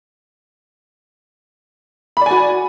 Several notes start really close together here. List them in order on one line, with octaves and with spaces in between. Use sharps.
B5 D5 G#5 F#4